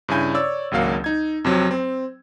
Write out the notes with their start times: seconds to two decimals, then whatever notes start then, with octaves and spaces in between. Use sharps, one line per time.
0.09 G2 C#3 E4 G#5 G6
0.34 C#5 D5 E6
0.71 G#1 C#2 F#3 A#3 F5 F#5
1.04 D#4 G#6
1.45 F2 C3 F#3
1.71 C4